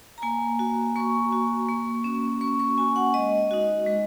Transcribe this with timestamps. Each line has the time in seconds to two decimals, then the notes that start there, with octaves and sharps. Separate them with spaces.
0.18 A#5
0.22 A#3 G#5
0.59 F#4
0.96 A#3 C#6
1.32 F#4
1.68 A#3
2.04 C#4 F#4
2.41 A#3 C#6
2.59 C#6
2.78 C#4 F#4 G#5
2.96 F#5
3.14 G#3 D#5
3.51 D#4 F#4
3.86 G#3